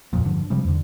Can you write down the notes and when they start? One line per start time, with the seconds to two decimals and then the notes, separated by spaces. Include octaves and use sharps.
0.13 D1 F2 A#2
0.25 E1 G2 D3 F3
0.50 C3 F3 G3 G#3
0.64 E2 D3